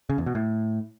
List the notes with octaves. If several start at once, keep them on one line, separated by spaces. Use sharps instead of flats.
C#3
E2
B2
A2